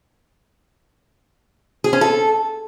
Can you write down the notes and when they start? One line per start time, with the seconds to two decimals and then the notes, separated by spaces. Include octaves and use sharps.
1.84 G#4
1.93 C#4
2.01 A4